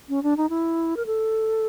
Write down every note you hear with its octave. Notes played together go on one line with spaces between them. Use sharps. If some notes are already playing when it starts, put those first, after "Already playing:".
C#4
D4
D#4
E4
A#4
A4